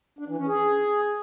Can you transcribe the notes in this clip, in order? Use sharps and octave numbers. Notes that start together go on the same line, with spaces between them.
D4
E3
C#4
G#4